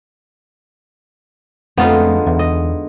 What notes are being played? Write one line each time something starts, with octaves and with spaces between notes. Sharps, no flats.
F2 D3 F3 G#3 A3 B3 D#4 F4
E2
D#5